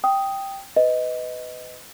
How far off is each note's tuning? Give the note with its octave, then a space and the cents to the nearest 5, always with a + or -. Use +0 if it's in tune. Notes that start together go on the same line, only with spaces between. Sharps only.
G5 +0 D#6 +5
B4 +25 D#5 +10